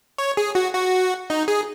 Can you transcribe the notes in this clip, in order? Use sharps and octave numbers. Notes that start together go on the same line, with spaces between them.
C#5
G#4
F#4
F#4
D#4
G#4